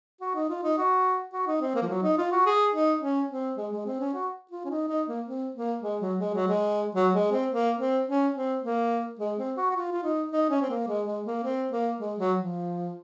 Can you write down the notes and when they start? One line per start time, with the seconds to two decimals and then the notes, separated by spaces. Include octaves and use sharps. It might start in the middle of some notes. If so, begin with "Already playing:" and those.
0.21 F#4
0.35 D#4
0.49 F4
0.63 D#4
0.78 F#4
1.33 F#4
1.47 D#4
1.61 C4
1.75 A#3
1.82 F3
1.89 F#3
2.03 D#4
2.18 F4
2.32 F#4
2.46 G#4
2.73 D#4
3.02 C#4
3.30 C4
3.57 G#3
3.72 G#3
3.86 C4
4.00 C#4
4.14 F#4
4.51 F4
4.65 C#4
4.70 D#4
4.88 D#4
5.08 A#3
5.26 C4
5.55 A#3
5.83 G#3
6.01 F#3
6.19 G#3
6.34 F#3
6.48 G#3
6.95 F#3
7.14 G#3
7.32 C4
7.51 A#3
7.79 C4
8.08 C#4
8.35 C4
8.63 A#3
9.19 G#3
9.38 C4
9.57 F#4
9.70 F#4
9.75 F4
9.92 F4
10.03 D#4
10.31 D#4
10.50 C#4
10.61 C4
10.70 A#3
10.88 G#3
11.06 G#3
11.26 A#3
11.44 C4
11.71 A#3
12.00 G#3
12.19 F#3
12.38 F3